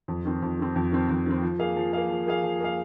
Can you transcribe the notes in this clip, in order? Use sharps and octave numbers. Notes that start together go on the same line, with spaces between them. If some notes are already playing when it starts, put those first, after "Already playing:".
F2
D#3 C4
F2
D#3 C4
F2
D#3 C4
F2
D#3 C4
F3
A#3 G#4 F5
F3
A#3 G#4 F5
F3
A#3 G#4 F5
F3
A#3 G#4 F5